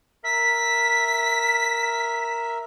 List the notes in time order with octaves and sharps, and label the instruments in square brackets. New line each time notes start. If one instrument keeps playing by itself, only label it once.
[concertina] A#4 E5 [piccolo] B6